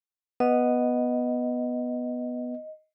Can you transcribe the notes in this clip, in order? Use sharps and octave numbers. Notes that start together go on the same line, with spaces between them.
B3 D#5